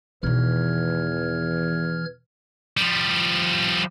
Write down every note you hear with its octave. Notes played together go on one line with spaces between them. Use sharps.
E2 B2 D#3 E3 F6 G#6
F3 G3